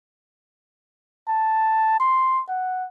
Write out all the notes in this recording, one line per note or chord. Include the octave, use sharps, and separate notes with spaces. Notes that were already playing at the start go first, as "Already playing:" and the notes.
A5
C6
F#5